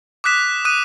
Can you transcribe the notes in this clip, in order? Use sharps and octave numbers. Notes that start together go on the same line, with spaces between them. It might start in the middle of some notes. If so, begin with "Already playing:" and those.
D6 D#6 F#6 B6 E7
D#6 F#6 D#7